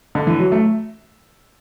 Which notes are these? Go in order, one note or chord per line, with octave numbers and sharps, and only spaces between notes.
D3
E3
F#3
A3